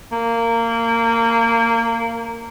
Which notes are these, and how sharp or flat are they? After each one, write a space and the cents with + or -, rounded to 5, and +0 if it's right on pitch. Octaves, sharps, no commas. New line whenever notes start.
A#3 -20